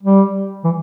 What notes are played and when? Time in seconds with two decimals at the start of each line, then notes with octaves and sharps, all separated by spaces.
0.03 G3
0.64 E3